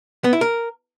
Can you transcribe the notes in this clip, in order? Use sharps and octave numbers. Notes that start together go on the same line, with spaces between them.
B3
E4
A#4